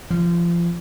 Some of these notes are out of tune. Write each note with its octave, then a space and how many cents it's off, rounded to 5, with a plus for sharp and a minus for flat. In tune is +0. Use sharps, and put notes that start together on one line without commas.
F3 -25